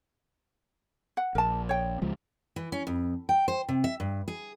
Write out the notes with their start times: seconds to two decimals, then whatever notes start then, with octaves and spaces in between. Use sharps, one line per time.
1.17 F#5
1.35 A#1 A#4 A5
1.69 C#5 G5
2.02 C#2 F3 G#3
2.56 E3
2.72 C#4
2.87 F2
3.29 G5
3.48 C5
3.69 C3
3.84 E5
4.00 G2
4.28 G#4